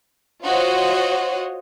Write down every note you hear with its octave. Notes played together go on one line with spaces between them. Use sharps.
F4 F#4 C5 C#5 D#5